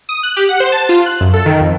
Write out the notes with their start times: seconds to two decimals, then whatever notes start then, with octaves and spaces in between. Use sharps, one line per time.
0.09 D#6
0.23 F#6
0.36 G4
0.49 F#5
0.60 C5
0.72 A5
0.89 F4
1.06 F#6
1.21 F#2
1.34 A4
1.46 D#3
1.60 F2